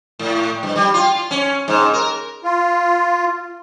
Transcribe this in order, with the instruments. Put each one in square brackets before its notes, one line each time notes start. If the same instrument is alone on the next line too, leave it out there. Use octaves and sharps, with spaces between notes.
[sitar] A2
G2
G3
F4
C#4
G#2
A#4
[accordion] F4